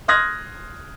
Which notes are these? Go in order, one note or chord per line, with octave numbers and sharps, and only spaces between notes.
C6 D#6 F6 F#6 G#6 A#6